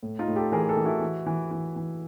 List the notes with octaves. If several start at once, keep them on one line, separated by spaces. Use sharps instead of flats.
A2
D#4 F4
A2
G4 A4
E3 G#4 A#4
G4 A4
E3
E4 F#4
E3
E3
E3
E3